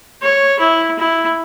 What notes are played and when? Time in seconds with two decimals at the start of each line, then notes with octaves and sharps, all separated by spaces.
0.22 C#5
0.59 E4
0.99 E4